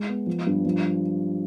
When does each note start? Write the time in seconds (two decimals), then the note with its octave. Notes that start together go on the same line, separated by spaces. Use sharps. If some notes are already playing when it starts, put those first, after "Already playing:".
Already playing: G#3
0.09 B3
0.27 F3
0.47 G2
0.65 F3